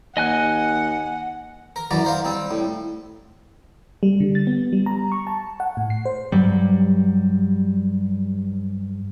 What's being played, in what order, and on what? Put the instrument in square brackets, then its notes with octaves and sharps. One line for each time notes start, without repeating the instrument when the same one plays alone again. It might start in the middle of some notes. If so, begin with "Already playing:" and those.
[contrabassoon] D#2 [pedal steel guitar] D#5 G#5 F#6 [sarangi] F#5
[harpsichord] A#4
F#2 E3 F#3 D5 A#5
A#4 C5 F5
G3 C4
A2
[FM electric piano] G3
D3
A6
B3
G3
A#5
C#6
A5
F#5
A2
C7
C5
[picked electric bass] G2 F#3 G3